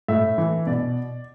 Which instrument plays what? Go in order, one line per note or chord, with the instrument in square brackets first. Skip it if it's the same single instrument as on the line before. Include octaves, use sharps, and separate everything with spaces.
[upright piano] A2 E5
E3
B2 D5